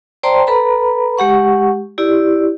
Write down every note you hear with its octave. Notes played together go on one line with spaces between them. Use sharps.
C5 D5 G5 A5 A#5 C6
A4 B4 A#5 B5
G#3 G4 F#5 C#6
E4 G4 D5